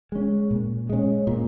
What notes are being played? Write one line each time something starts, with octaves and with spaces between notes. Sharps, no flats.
G#3 C#4
A#2
G#3 C#4
A#2